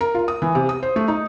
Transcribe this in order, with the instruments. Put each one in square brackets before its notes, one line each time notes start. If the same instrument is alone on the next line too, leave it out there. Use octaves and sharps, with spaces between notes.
[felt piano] A#4
F4
D#6
E3
C3
D#6
C5
A3
D#4